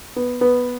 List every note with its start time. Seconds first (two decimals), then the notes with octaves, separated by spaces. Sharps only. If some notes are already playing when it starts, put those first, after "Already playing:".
0.16 B3
0.41 B3